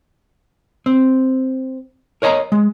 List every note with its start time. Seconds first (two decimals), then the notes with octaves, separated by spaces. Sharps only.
0.86 C4
2.22 A#4 C#5 D#5 A5 A#5
2.52 G#3